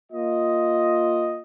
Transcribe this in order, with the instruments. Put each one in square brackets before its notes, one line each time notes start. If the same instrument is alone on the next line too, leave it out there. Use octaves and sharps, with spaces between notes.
[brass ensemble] A#3 F4 D#5